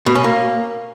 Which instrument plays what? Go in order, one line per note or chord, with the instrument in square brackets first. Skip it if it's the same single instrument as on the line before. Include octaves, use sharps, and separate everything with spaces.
[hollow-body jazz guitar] B2
C#4
A#3